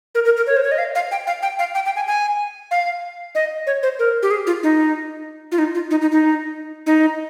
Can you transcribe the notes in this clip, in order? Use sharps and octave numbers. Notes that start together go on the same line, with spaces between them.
A#4
A#4
A#4
C#5
C5
C#5
D#5
F5
F5
G5
F5
G5
F5
G5
G5
G#5
G#5
F5
D#5
C#5
C5
A#4
G4
G#4
F4
D#4
F4
D#4
F4
D#4
D#4
D#4
D#4